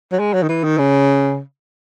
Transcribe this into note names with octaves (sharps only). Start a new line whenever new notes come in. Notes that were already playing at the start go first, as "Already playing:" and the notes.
F#3
G#3
F#3
D#3
E3
D#3
C#3